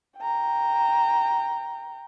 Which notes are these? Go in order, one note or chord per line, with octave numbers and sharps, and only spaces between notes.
G5 A#5